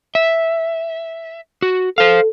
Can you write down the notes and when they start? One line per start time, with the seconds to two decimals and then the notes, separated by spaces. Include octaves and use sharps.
0.15 E5
1.62 F#4
1.98 A4 C5 F5